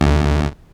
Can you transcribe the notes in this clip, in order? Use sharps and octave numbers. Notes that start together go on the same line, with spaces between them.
D2